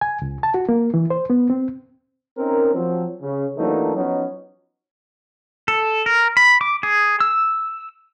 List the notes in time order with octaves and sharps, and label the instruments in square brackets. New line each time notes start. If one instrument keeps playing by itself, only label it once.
[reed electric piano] G#5
C#2
A5
F#4
A#3
E3
C5
B3
C4
[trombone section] C4 C#4 D#4 A#4
F3 F#3 C4
C#3
E3 F#3 A3 A#3 D4 D#4
F3 F#3 B3 C#4 D#4
[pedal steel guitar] A4
A#4
B5
D6
G#4
E6